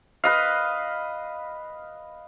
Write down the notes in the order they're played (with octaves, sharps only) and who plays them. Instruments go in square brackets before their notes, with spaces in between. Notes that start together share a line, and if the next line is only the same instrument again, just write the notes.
[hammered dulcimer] B4 D#5 F5